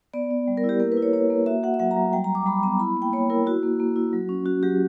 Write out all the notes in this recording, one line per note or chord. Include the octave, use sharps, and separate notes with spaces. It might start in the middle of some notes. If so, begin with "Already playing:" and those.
B3 D5
B3
G3
A#4
E4
G4
A#3 A#4
B4
E4
C#5
A#3 C#5
A#3
F#4 E5
F#4 F#5
E5
F#3 F#5
A#5
F#3
G3 G5
A#5
G3
D6
G3 B5
B3 A#5
E4 B5
A#3 G5
A#3 C#5
E4 A#4
E4 F#4
A#3
A#3
E4
F#3
C#4
C#4 F#4
F#3 G4